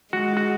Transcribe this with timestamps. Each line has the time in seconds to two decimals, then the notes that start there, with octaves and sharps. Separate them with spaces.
0.13 G#3 F#4
0.37 F#4